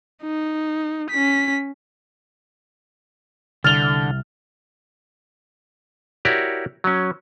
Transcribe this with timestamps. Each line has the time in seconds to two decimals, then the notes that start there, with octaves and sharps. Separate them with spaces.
0.23 D#4
1.10 C#4 B6
3.64 C2 D3 F6 A6 F7 G7
6.25 E4 F#4 G4 A#4 C#5 D5
6.84 F#3 C#4